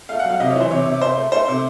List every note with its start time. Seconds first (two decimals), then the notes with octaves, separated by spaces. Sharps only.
0.09 A3 F5
0.19 F#5
0.24 F#3
0.30 F5
0.40 C3 D#5
0.50 C#5
0.55 E3
0.60 C5
0.70 C3 C#5
0.86 C3
1.01 C3 C5
1.17 A3
1.32 A3 C5
1.48 C3